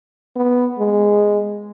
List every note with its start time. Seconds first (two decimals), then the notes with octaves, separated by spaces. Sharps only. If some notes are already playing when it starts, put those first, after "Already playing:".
0.36 B3
0.78 G#3